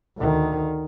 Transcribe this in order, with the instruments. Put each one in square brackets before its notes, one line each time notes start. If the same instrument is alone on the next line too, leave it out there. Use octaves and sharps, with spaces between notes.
[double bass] D2 D#3